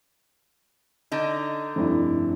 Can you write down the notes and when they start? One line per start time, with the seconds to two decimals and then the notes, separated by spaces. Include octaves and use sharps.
1.12 D3 D#4
1.76 F1 G2 E4